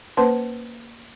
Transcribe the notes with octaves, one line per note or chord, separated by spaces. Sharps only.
A#3 C#4 B4 C5 A5 C6